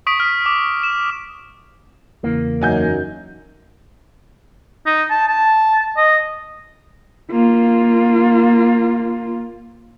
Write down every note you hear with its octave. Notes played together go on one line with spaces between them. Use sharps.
C#6 D#6 B6 D7
F6
D6
E7
E2 C#3 E3 A#3
F#2 F#3 D#4 G#5 G6
D#4
A5
A5
D#5
A#3 F4